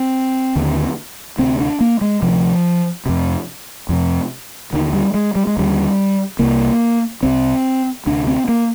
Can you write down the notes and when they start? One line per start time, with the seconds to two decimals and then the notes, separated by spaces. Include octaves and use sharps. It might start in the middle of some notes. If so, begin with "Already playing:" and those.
Already playing: C4
0.56 D#2 D3
1.38 D2 C3 C4
1.60 D4
1.80 A#3
2.01 G#3
2.22 D2 C3 F3
3.06 F2 C3
3.89 F2 C3
4.73 D#2 D3 D#3
4.93 G3
5.14 G#3
5.36 G3
5.47 G#3
5.57 D#2 D3 G3
6.39 C2 C3 A#3
7.23 C2 C3 C4
8.06 D2 C3 D4
8.27 C4
8.48 A#3